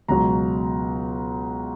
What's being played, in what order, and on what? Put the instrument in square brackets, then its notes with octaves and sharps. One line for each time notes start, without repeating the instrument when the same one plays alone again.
[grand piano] C#2 B2 F#3 A#5